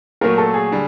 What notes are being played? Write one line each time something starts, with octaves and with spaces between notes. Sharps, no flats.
A#2 F#3 A3 A#4
A4
G#4
D3 G3